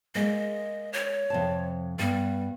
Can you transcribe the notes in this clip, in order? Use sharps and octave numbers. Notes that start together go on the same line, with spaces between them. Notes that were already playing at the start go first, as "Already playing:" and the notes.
G#3 A#3 D#5
C#5
F2 C3 A5
G2 G3 B3